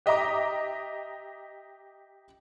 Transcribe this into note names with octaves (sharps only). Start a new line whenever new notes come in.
G4 D#5 E5 A#5 D6